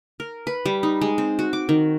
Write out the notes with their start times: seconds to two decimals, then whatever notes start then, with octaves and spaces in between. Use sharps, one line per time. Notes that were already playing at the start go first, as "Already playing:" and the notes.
0.20 A#4
0.47 B4
0.66 G3
0.83 D#4
1.01 G#3
1.18 C4
1.39 F#4
1.53 D6
1.69 D#3